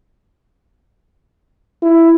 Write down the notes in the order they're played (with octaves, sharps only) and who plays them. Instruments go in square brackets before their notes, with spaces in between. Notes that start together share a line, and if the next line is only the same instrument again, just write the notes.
[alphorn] E4